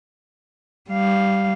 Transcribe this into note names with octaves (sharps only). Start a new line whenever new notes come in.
G3 F5